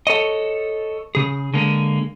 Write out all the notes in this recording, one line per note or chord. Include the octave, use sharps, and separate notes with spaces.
A4 C#5 D#5
C#3 G#4
D3 G#3 A#3